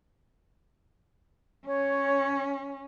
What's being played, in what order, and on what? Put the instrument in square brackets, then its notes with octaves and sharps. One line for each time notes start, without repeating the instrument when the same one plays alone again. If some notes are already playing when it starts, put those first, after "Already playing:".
[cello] C#4 [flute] C#5